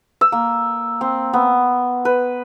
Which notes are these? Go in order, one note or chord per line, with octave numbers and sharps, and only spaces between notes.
E6
A#3
C4
B3
B4